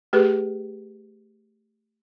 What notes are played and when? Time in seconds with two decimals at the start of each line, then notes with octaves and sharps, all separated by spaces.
0.13 A3 G4 G#4 B4